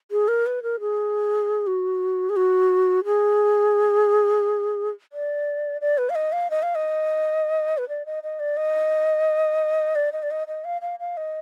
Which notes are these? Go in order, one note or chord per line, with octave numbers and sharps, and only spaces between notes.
G#4
A#4
B4
A#4
G#4
F#4
G#4
F#4
G#4
D5
D5
B4
F5
D#5
F5
D#5
F5
D#5
B4
D5
D#5
D#5
D5
D#5
D5
D#5
D5
D#5
D#5
F5
F5
F5
D#5